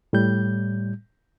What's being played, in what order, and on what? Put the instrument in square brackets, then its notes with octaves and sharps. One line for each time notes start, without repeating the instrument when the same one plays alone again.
[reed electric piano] A2 G3 G6